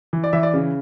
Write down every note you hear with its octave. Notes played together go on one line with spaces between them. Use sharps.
E3
D5
E3 E5
D5
C#3